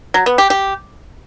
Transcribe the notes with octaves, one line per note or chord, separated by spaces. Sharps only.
F#3
B3
G4
G4